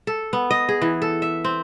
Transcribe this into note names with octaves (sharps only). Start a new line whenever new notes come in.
A4
B3
D#5
G#4
E3
A4
E5
C4